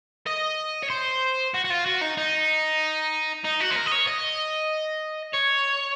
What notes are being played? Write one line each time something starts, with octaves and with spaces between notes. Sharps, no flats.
D#5
C#5
C5
F#4
F#4
F4
F#4
D#4
D#4
D#4
F#4
C5
A#4
D#5
C#5
D#5
C#5